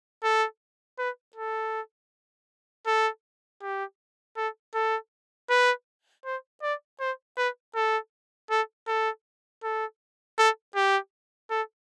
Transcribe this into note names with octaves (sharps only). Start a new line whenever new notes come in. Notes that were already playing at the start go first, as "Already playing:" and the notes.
A4
B4
A4
A4
G4
A4
A4
B4
C5
D5
C5
B4
A4
A4
A4
A4
A4
G4
A4